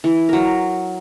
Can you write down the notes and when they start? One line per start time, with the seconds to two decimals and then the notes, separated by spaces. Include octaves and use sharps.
0.04 E3
0.29 F#3 A#4